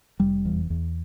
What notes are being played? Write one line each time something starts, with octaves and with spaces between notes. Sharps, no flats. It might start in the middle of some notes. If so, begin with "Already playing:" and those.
F1 G3
E2
E2